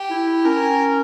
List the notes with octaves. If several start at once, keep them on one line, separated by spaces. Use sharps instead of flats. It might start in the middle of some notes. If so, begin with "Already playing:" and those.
Already playing: G4
E4
C#4 A#4